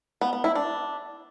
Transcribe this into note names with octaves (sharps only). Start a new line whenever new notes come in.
B3
B3
E4
D4